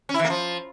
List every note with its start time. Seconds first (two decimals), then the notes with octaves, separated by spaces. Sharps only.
0.09 C#4
0.14 E4
0.20 E3
0.25 A#3
0.30 F3